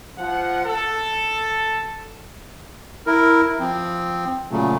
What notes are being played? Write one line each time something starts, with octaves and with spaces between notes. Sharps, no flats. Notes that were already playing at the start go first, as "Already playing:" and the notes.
F3 F#5
A4
E4 A#4
F3 C4
A#2 C#3 F#3 A3